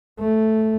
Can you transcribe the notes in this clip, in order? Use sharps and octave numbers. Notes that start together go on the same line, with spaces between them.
A3